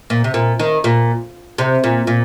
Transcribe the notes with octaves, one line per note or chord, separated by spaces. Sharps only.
A#2
C3
A#2
D#3
A#2
C3
A#2
A#2